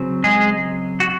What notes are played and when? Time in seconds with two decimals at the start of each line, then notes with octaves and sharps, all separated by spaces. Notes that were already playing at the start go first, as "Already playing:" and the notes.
Already playing: C#3 F#3 C4
0.24 G#3 G#4
1.00 F#4